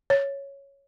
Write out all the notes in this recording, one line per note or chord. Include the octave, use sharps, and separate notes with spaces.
C#5